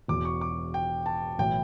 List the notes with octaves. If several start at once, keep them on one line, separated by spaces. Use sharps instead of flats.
E1 E2 B2 D6
C#6
D6
G5
A5
B1 A2 E3 G5